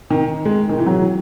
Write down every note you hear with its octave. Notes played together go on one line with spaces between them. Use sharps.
D#3
G#3
D#3
E3
F#3